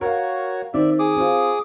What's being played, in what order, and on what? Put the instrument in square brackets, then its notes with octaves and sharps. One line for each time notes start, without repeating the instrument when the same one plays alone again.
[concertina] F#4 C#5 [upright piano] A#4 F5
[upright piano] D#3 C4 [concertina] D5 E5
[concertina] G#4 D6 D#6
[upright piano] C4 F4